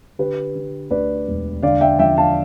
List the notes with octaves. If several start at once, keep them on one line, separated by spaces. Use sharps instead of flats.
D3 G4 B4
D3
D2 B4 D5
E1
D3 D5 F5
E5 G5
F3 E5 G5
F5 A5